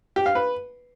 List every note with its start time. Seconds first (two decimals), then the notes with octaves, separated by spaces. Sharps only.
0.16 G4
0.26 F5
0.35 B4